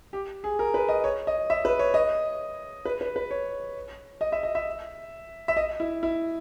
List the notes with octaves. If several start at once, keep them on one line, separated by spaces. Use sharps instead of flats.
G4
G#4
A#4
B4
D#5
C#5
D#5
E5
B4
C#5
D#5
B4
B4
B4
C#5
D#5
E5
D#5
E5
E5
D#5
E4
E4